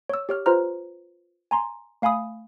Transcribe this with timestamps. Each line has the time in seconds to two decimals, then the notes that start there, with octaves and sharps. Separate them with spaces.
0.09 C#5 E6
0.29 G4 C#5 F6
0.46 F4 B4 C5 A#5 F6
1.51 G#5 A#5 C6
2.02 A3 F5 G#5 B5 D#6